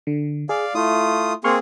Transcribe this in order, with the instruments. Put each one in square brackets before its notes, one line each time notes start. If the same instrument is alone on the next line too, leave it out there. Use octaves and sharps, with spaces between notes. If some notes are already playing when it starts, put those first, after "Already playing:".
[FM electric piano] D3
[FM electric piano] G#4 [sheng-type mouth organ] D5 F5
[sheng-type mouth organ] A3 F4 D#6 [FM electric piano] E4
[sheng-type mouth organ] A#3 C4 G#4 [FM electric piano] C6 C#6 F6